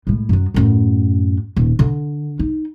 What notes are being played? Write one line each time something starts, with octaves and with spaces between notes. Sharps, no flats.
A2 G#3
F#2 F#3
F#2 A2
D#1
D3
D#4